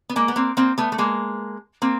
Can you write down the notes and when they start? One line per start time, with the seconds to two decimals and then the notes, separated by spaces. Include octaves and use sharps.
0.09 B3
0.16 G#3 A#3
0.28 B3
0.36 A#3 C4
0.57 A#3 C4
0.78 A3 B3
0.92 A3
0.98 G#3 A#3
1.82 A#3 C4